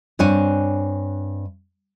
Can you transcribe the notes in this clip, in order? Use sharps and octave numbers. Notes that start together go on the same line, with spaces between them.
G2 C4 D4 C#5 G#5